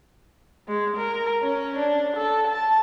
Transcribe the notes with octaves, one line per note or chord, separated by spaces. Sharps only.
G#3
A#4
C#4
D4
A4
A5